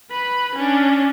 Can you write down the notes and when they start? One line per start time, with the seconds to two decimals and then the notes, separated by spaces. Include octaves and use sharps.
0.11 B4 B5
0.55 C#4 D4